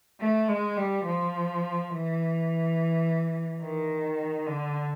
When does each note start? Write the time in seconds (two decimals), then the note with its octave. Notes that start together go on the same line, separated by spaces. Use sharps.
0.20 A3
0.48 G#3
0.77 G3
1.05 F3
1.91 E3
3.61 D#3
4.47 D3